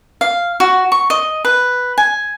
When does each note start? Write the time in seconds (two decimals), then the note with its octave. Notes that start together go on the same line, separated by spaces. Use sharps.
0.21 F5
0.60 F#4
0.92 C#6
1.10 D#5
1.45 B4
1.98 G#5